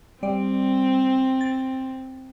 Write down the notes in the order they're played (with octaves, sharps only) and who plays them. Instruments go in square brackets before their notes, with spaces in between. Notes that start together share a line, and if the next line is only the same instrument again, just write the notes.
[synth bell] G3 D5 [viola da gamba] C4
[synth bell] A6